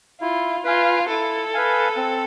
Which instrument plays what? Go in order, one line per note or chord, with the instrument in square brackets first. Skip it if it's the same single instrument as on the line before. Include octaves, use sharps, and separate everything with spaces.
[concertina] E4 [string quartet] F4
[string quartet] F4 [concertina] B4 F5 G#5
[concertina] E4 [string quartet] A4
[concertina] B4 F5 G#5
C4